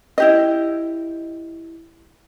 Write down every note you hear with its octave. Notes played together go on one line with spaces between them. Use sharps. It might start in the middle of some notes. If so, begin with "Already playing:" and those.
E4 G4 D#5